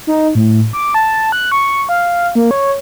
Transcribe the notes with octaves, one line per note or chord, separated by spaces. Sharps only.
D#4
A2
D6
A5
F#6
C#6
F5
A#3
C#5